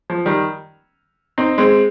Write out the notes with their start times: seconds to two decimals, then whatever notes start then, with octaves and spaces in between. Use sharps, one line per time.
0.10 F3
0.25 D#3 G3
1.38 C4 D#4
1.58 G#3 C4